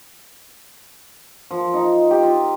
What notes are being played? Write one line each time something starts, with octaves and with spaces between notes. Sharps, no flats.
F3
D#4
G4
F4